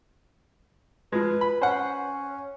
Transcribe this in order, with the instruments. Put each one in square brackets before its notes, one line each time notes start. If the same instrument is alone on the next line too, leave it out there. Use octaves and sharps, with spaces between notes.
[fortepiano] F3 G#3 [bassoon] B4
[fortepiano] B5
[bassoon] C#4 [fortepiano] C5 F#5